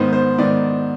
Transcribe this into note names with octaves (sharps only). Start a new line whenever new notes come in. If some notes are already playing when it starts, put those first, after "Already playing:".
Already playing: G#2 D#3 B3 C5
C5
G#2 D#3 B3 D5